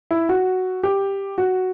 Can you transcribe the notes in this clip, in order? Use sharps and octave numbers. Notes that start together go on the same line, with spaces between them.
E4
F#4
G4
F#4